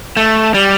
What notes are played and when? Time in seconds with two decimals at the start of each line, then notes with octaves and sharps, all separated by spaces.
0.17 A3
0.54 G3